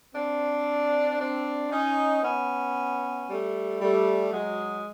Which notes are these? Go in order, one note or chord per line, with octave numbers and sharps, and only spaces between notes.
C4 D4
C4 D4
C#4 D#4
B3 C#4
G3 A3
G3 A3
F#3 G#3